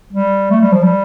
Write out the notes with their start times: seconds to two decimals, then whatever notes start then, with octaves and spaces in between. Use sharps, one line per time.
0.13 G3
0.51 A3
0.62 G3
0.72 F3
0.83 G3